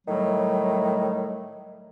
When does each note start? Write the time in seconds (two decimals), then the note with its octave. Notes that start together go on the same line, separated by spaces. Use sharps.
0.07 A2 D#3 F#3 G3 A3